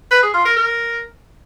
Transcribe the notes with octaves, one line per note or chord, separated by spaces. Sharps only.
B4
G#4
F4
A#4
A#4